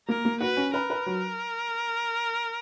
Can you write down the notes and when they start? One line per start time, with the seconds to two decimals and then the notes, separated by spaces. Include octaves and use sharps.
0.08 A#3 A#4
0.25 A#3
0.40 F#4 B4
0.57 C#4
0.74 A#4 B4
0.90 B4
1.06 F#3